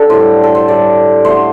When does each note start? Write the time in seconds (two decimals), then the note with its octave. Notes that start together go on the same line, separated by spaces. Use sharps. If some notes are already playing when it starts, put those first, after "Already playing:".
Already playing: D3 D4 G4 A4
0.10 A2 G3 C5
0.44 A4
0.55 C5
0.68 A2 G3 D5
1.25 D3 A3 C5